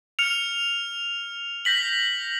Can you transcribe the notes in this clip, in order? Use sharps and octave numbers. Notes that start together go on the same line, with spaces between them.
F6 C#7 F7
G6 A#6 B6 F#7